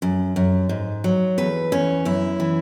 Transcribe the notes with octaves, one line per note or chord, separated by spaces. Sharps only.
F#2
F#2
G#2
F#3
E2 B4
E2 C#4
F#2 E4
E3